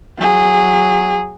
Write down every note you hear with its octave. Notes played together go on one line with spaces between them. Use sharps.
F#3 G#4